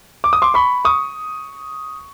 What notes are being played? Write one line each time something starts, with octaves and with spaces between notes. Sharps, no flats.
D6
D#6
C6 D6
B5 C#6
C#6 D#6